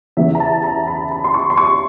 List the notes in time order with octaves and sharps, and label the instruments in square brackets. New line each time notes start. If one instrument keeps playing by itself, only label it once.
[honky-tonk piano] E2 C#3 E3 E5
A#5
A5
A#5
B5
B5
C6
C#6
C6
C#6